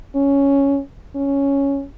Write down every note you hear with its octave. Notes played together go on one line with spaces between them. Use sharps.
C#4
C#4